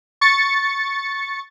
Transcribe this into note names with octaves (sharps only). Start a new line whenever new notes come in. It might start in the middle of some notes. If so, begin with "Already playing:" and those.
C#6 A6 C#7